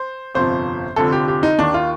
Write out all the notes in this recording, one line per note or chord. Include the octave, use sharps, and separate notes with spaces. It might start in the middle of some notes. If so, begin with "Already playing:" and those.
Already playing: C5
G1 F2 C3 F3 C5
F1 F2 D3 F3 A4
G4
G4
D#4
D#2 D#3 D4
F4